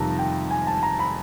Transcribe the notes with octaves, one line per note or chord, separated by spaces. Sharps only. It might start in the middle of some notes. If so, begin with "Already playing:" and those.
Already playing: F2 C3 D#3 G3 A5 A#5
G5
G#5
A5
A#5
B5